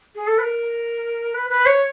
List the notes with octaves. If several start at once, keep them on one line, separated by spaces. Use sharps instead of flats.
G#4
A4
B4
A#4
B4
B4
C#5